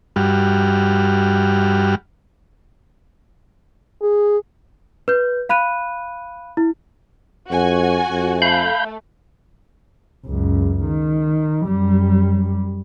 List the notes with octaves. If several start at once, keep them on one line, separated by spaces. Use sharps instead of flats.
G2 G3 F#4 F6
G#4
B4 G6
F5 B5 F#6 D#7
E4
F2 F#4 G#5
F2
A3 F5 B5 G6
C#2 F#2
D#3
F#2 G3